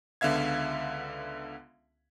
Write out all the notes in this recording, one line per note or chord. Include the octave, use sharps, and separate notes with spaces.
C#2 D3 B3 E5 F5 G#6